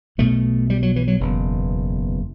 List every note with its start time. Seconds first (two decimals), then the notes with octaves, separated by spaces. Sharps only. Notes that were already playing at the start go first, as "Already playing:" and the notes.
0.18 B1 B2 A3
0.70 G3
0.83 F#3
0.96 E3
1.08 F#3
1.20 F#1 E2 B2